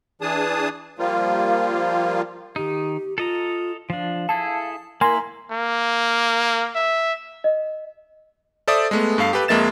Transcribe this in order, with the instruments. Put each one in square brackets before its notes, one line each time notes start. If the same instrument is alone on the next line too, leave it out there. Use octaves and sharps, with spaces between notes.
[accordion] E3 D4 G#4 A5 D#6
F3 G3 A#3 F4
[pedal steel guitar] D#3 D#4 [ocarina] G4
[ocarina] F4 [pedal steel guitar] A4 D#5 A#5
[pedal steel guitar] F3 D4 [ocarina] F5
[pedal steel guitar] E4 G#4 A4 [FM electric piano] A5
[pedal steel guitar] A#3 E4 [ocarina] A#4 [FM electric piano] G#5 A#5 C6
[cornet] A#3
E5
[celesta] D#5
[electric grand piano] A4 C5 D5 E5 D#6 E6
G#3 A3 B3
G2 A4 F5 C7
G4 A4 B4 G5
F2 G#3 A#3 E5 A6 E7